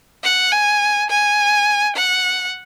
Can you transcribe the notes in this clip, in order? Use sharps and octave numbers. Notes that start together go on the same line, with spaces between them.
F#5
G#5
G#5
F#5